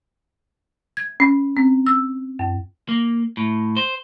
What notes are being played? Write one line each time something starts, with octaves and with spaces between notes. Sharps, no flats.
G#6
C#4
C4
E6
F#2
A#3
A2
C5